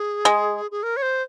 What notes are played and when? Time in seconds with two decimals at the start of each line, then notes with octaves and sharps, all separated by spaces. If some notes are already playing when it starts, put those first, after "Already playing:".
Already playing: G#4
0.25 G#3
0.71 G#4
0.83 A#4
0.97 C#5
1.02 C5